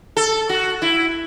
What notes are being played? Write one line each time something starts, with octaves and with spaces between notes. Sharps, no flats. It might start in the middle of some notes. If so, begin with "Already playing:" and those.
A4
F#4
E4